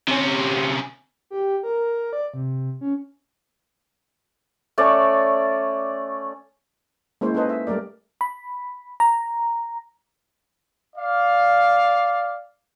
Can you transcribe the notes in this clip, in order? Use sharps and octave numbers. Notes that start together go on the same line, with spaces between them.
C3 C#4
G4
A#4
D5
C3
C#4
A3 C#4 C#5 D5
G#3 A#3 C#4 E4 C5 C#5
C#4 D#4 A4 B4 C5 D#5
C5 E5
G3 A3 A#4 D5
B5
A#5
D5 F5